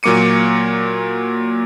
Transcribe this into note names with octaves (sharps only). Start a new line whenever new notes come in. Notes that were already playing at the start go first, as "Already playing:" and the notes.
A#2 F#3 A#3 D6 C#7 D#7